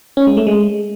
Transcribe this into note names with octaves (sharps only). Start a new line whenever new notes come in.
C#4
G#3
A3
G#3